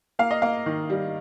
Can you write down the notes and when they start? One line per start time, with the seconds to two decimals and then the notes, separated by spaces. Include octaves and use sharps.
0.19 A#3 F5
0.31 D#5
0.42 A#3 F5
0.66 D#3
0.90 G3